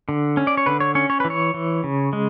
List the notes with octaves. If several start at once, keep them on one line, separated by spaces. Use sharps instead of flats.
D3
C#4
D5
C#5
D3 B4
C#5
C#4 C#5
C#5
E3 B4
C#5
E3
C#3
G#3